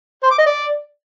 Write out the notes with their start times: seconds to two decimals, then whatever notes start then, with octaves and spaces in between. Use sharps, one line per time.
0.23 C5
0.31 D6
0.38 D#5
0.46 D5